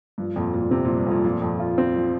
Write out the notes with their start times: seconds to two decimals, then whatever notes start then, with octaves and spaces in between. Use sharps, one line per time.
0.18 G2 F3
0.36 F2 A#2
0.54 F2 A#2
0.71 C3 C4
0.85 A#2
0.89 F3
0.97 G2
1.07 F2 A#2
1.24 A#2 F3
1.42 F2
1.60 F4
1.78 C4
1.95 F3